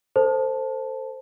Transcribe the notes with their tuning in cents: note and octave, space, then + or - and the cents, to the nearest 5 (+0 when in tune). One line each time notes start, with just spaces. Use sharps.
A4 +30 C5 +0 A5 +0